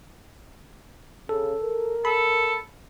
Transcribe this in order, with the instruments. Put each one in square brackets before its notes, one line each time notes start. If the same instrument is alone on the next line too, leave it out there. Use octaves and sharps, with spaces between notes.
[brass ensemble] C#3 [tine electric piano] A4
[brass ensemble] A#4
[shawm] A4 [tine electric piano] B5